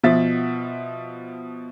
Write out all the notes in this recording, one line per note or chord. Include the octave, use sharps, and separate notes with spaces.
B2 F3 E5 A6